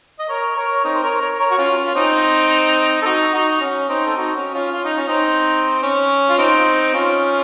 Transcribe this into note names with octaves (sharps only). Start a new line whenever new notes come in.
D#5
A#4 C#5
A#4 C#5
C4 D#4
C5
A#4 C#5
A#4 C#5
A#4 C#5
F#4
C#4 F4
C#4
F4
C4 D#4
A4
D#4 F#4
D#4 F#4
C#4
C4 D#4
A4
D#4 F#4
C#4
C#4 F4
F4
D#4
C#4
C4 D#4
C#4
F4
C4 D#4
C#4 F4